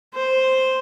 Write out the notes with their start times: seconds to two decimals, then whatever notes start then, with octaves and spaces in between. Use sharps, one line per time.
0.14 C5